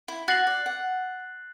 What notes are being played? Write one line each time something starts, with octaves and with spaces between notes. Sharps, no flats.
E4
F#4 F#6 A6 C7 F#7
D5
F#5